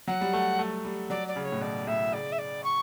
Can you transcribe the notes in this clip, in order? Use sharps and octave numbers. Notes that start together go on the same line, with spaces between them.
F#3 F#5
G3
A3
A3
G3
F#3 D5
D5
C#3
C#5
A2
B2 D5
A2 E5
C#3 D5
E5
D5
C#6